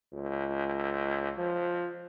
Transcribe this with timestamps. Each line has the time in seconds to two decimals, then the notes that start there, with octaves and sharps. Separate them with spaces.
0.13 C#2
1.38 F3